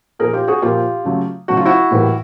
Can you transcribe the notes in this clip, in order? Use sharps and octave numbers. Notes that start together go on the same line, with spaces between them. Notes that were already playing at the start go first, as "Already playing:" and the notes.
A#2 F3 A#3 G#4 A#4
F4 G4
F#4 G#4
A#2 F3 A#3 F4 G4
C#3 F#3 A3
C#3 F#3 A3 F#4
F4
E4 F#4
A2 E3 G3 A#3